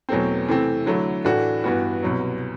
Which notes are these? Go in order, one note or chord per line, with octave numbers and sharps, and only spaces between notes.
E2 B2 F#3 A3 C4
C3 E3 A3 C4
D3 F#3 A3 E4
A2 E3 A3 D4 F#4
G2 E3 B3 F#4
C2 B2 F#3